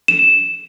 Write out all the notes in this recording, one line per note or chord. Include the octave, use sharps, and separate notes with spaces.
E7